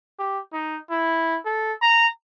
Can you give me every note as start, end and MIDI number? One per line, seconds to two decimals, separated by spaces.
0.19 0.40 67
0.53 0.79 63
0.90 1.39 64
1.46 1.73 69
1.82 2.07 82